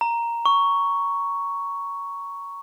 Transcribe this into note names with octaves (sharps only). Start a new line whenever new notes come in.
A#5
C#6